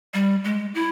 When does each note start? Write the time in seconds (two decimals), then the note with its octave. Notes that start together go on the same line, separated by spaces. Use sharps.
0.14 G3
0.44 G#3
0.75 E4